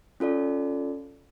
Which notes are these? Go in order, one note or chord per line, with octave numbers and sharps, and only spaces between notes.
C#4 F4 A4 D5